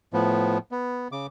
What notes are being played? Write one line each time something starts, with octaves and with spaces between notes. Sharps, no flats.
A2 F3 B3
B3
C#3 D6